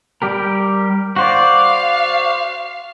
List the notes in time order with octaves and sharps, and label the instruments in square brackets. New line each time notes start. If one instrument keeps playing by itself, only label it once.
[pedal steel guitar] G3 G4 A#4
[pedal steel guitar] F#4 C5 D5 [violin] F5